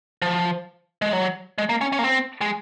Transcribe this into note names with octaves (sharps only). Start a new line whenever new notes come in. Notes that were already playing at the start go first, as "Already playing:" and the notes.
F3
G#3
F#3
G#3
A#3
C#4
C#4
A#3
C4
G#3